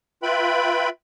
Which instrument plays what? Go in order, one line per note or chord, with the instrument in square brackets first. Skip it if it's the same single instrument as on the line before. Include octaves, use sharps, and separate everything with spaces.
[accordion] F4 B4 E5 G5 B5